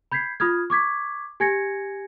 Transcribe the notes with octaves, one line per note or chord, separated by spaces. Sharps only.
B5 G6 G#6 B6 C7
F4 B5 D#6 F6 G#6
C#6 D6 G#6 B6
G4 G#5 G#6 A#6 C#7